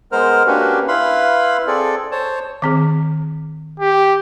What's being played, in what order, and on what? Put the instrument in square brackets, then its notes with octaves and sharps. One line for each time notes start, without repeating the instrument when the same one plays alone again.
[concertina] G#3 B3 A#4 C5 F6
A#3 C#4 D4 F#4 G4 B4
E4 B4 F5 B5 C6
C4 G#4 A4 D5
C5 C#5 A5
[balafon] D#3 C4 G#4
[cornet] G4